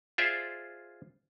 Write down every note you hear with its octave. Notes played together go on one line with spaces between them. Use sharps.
F4 G#4 C5 D5 E5